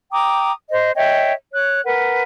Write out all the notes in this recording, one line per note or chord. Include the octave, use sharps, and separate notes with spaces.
G5 A#5 D6 D#6
C5 D#5
C#5 D#5 E5 G5
C#5 F#6
A#4 B4 F#5